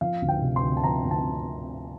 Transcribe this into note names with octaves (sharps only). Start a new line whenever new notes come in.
F3 F5
D2
G5
C3
C6
D2
A5
F3 A#5
D2
A5